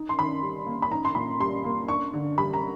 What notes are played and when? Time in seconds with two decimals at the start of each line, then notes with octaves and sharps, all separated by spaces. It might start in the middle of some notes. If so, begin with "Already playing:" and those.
Already playing: D#4
0.09 C6
0.18 D#3 B5
0.42 G3
0.66 A#3
0.82 B5
0.91 D#4 A#5
1.05 C6
1.15 A#2 B5
1.40 G3 C6
1.64 A#3
1.88 D4 C#6
2.13 D3
2.38 G3 B5
2.53 A#5